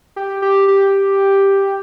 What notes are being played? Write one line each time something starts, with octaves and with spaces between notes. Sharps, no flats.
G4
G4
G4